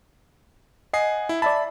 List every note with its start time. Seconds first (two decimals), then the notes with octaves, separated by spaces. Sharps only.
0.93 D#5 F#5 G#5 C7
1.29 E4
1.42 D5 E5 A5 B5